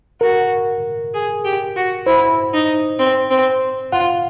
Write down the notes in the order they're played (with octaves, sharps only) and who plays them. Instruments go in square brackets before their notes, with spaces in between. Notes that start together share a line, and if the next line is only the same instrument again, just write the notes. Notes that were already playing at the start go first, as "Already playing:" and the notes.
[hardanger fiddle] F#4 [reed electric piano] A#4
[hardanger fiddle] G#4
G4
F#4
[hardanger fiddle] E4 [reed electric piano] C5
[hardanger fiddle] D#4
C4
C4
[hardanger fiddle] F4 [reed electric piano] F#5